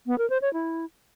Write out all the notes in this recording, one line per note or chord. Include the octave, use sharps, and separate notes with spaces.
B3
A#4
C5
C#5
E4